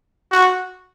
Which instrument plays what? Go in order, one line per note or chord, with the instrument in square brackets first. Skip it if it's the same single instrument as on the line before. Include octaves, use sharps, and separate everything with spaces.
[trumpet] F#4